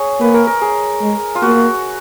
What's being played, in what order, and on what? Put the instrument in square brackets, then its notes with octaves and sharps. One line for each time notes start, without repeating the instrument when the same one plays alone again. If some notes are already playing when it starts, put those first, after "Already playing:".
Already playing: [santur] G#4 C#5
[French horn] A#3 [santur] B4
[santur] A#4
A#4
G#4
[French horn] G#3
[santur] F4
[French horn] A#3 [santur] F#4